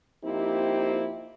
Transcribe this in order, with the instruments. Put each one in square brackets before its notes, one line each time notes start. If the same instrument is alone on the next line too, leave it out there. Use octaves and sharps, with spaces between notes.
[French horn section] F3 A#3 C4 D#4 E4 G4